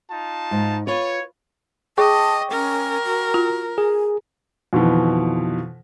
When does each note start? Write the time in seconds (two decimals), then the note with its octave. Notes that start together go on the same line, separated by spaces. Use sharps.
0.11 D#4 F4 A5
0.51 G#2
0.87 F4 B4 C#5
1.98 G#4 D#5 G5 A5 C#6 D6
2.51 C#4 A#4
3.05 F#4
3.34 F4
3.78 G#4 G#5
4.73 F2 B2 D#3 E3